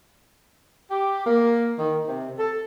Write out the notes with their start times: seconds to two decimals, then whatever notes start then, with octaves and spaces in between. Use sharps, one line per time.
0.91 G4
1.26 A#3
1.78 D#3
2.07 C3
2.37 A4